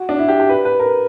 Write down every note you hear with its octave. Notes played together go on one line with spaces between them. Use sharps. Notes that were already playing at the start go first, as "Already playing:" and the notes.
Already playing: F#4
D4
E4
G4
G4
B4
B4
A#4